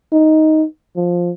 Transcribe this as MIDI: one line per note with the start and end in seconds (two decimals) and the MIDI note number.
0.12 0.65 63
0.96 1.31 53